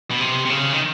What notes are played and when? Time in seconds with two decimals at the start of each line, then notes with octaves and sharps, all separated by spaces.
0.11 B2
0.20 C3
0.45 C3
0.50 C#3
0.73 D#3